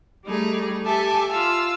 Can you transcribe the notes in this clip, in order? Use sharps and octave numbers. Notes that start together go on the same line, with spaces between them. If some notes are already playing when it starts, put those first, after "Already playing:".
G3 A3 D#4 G#4
G4 A4 E5 G#5 A5
F4 F5 E6